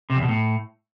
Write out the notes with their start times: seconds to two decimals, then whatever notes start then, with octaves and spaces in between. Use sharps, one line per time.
0.10 C3
0.16 E2
0.22 B2
0.29 A2